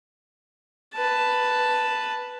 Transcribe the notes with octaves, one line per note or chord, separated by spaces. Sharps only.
B4 A5